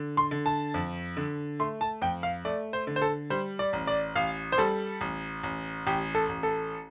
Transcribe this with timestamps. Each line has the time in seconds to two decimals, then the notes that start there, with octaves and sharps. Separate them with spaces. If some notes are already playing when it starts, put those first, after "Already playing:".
Already playing: D3
0.17 C6
0.31 D3
0.46 A5
0.74 F2
1.17 D3
1.60 A3 C6
1.81 A5
2.02 F2 G5
2.23 F5
2.45 A3 D5
2.73 C5
2.87 D3
2.96 C5
3.02 A4
3.30 G3 C5
3.59 D5
3.73 A1
3.87 D5
4.15 A1 F5
4.52 C5
4.58 G3 A4
5.01 A1
5.43 A1
5.87 A1 G4
6.15 A4
6.29 A1
6.43 A4